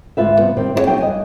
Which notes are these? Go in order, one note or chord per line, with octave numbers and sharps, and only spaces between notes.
D2 G#2 F4 B4 E5
C3 G3 B3
C3 D#3 G3 C4
C4 E4 F#4 G#4 C#5
C3 F#3 B3 D#4 G5
G2 D#5 G#5